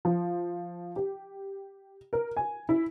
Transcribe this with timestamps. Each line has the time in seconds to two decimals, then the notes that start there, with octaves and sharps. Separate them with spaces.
0.05 F3
0.96 G4
2.13 A#4
2.37 G#5
2.69 E4